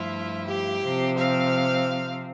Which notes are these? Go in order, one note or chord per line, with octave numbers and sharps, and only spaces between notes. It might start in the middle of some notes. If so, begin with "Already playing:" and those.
Already playing: G2 F3 A3 E4 F4
G4
C3 F3 C4
F5